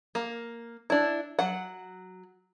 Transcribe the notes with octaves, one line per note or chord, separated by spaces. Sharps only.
A#3
D4 E4
F#3 F#5